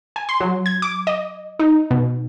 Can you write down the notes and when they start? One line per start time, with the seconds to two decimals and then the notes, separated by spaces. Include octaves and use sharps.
0.16 G#5
0.29 C6
0.40 F#3
0.66 G#6
0.82 D6
1.07 D#5
1.59 D#4
1.91 B2